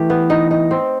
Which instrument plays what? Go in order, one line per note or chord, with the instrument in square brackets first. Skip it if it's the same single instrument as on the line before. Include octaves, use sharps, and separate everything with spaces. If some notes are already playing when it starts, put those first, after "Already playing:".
Already playing: [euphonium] E3 [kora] A3 G4
[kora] B3
D#4
D#4
C4